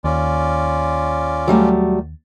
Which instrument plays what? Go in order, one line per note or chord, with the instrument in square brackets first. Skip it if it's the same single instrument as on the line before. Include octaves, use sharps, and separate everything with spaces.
[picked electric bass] D#2 [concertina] C#4 F4 D5
[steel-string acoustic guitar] F#3 G3 A3